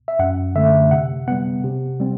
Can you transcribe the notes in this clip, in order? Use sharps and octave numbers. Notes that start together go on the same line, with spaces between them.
E5
F#2 F#5
D3 A3 E5
C3 F#5
G3 B3 F#5
C3
G3 C4